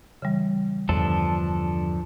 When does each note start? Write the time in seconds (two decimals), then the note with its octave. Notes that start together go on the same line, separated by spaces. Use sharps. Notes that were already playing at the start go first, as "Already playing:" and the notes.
0.22 C#3 E3 G3
0.89 E2 G2 D3 F3 D4 A4